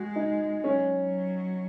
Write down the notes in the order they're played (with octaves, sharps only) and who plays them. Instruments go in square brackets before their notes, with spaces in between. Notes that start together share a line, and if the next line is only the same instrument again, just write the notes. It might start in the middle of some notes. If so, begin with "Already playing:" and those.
Already playing: [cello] G#3 [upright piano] F#4
[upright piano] D#4
[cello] F#3 [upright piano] C#4